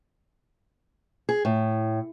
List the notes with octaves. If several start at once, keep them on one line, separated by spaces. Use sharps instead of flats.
G#4
A2